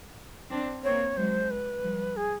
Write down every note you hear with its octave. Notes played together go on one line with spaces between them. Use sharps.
C4 D4
A#3 C4 C#5
F#3 G#3 C5
B4
F3 G3
G#4